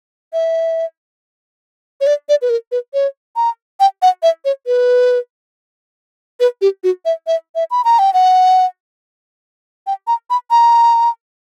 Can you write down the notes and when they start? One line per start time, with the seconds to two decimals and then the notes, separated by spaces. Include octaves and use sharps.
0.33 E5
2.01 C#5
2.07 D5
2.29 D5
2.42 B4
2.50 A#4
2.72 B4
2.94 C#5
3.36 A#5
3.80 G5
4.02 F#5
4.23 E5
4.45 C#5
4.67 B4
6.40 B4
6.61 G4
6.84 F#4
7.05 E5
7.27 E5
7.55 E5
7.71 B5
7.84 A#5
7.99 G5
8.14 F#5
9.87 G5
10.07 A#5
10.30 B5
10.51 A#5